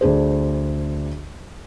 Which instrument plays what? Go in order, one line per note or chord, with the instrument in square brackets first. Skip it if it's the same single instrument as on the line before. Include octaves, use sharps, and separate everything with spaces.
[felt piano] D2 D4 G#4 C5